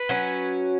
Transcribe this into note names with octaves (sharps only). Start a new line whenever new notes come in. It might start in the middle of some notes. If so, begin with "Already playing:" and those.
Already playing: B4
F#3 C#4 F#4